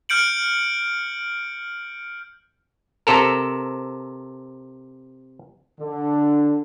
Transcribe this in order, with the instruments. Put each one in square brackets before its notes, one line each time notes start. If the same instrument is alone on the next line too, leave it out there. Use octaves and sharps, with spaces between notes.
[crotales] F6 G6 C#7 D7 F#7
[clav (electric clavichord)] C3 A4 A#4
[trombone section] D3